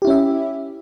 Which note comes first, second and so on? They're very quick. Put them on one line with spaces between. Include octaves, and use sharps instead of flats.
G4 E4 C#4 E5